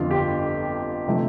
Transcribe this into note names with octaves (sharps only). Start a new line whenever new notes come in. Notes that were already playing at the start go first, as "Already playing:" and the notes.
Already playing: G1 F2 D3 F3 F4
G4
C3 F3 A3